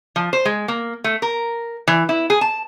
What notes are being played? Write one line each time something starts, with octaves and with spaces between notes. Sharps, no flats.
F3
C5
G#3
A#3
A3
A#4
E3
E4
G#4
A5